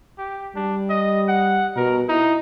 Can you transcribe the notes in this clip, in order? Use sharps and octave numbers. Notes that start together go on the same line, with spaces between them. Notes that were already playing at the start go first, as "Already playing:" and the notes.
G4
G3 D4
D#5
F#5
B2 A#4
D#4 E4